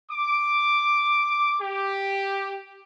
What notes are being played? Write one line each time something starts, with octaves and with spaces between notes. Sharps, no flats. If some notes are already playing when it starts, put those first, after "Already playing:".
D6
G4